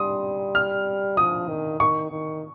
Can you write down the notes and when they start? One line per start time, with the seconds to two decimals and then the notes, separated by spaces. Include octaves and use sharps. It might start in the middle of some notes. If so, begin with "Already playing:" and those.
Already playing: G3 C6 D#6
0.55 F6
1.17 F3 D#6
1.49 D#3
1.80 D#3 C#6
2.12 D#3